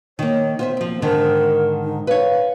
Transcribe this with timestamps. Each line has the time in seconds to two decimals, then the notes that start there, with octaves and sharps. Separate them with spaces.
0.19 D#3 A#3 C#5
0.59 B3 F4 C5 E5
0.77 F3 A#3 C4
1.02 G#2 D3 D#3 A#4
1.84 D#4
2.07 B4 C#5 F5